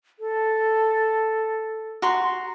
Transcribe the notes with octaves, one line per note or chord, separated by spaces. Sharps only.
A4
F#4 A#5 C6